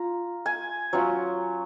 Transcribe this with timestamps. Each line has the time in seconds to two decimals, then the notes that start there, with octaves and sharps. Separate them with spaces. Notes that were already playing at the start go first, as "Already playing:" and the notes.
Already playing: F4 A#5
0.46 G#5
0.93 F#3 C#4 F4